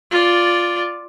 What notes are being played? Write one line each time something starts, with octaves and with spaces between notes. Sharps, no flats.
F4 D5